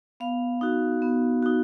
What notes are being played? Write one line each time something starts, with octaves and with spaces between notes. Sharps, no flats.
B3 F5
D#4 F#4
B3
D#4 F#4